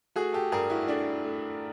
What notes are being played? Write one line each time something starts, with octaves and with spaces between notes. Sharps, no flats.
A3 F#4 G#4
G4 A4
G2 G#4 A#4
E4 F#4
A3 D4 E4
A3